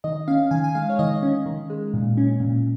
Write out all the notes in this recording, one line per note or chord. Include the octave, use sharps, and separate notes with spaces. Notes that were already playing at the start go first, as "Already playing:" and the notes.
D#3 D#5
C#4 F5
D#3 G#5
G#5
G#3 F5
C#5
D#3 D#5
C#4
D#3
G#3
A#2
C#4
A#2